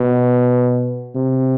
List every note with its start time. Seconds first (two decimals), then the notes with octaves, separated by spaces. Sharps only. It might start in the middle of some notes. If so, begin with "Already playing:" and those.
Already playing: B2
1.15 C3